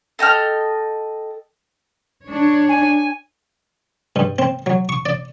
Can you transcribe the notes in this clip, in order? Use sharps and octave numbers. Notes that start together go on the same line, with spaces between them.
A4 D#5 G5 F6
D4 C#5
G#5
G2
C4
F#3
C#6
D5